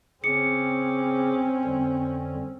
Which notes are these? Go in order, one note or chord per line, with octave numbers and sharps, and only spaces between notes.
C#3 C4 C#4 G#4 D6 C#7
F2 D3 G3